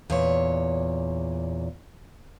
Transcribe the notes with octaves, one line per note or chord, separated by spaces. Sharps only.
E2 A#2 C#5